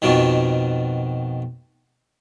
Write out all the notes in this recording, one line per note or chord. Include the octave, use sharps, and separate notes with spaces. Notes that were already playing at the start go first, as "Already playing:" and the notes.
F2 B2 D#3